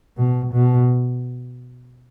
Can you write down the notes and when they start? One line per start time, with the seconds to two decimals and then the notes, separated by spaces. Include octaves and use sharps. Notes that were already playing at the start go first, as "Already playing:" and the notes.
0.17 B2
0.53 B2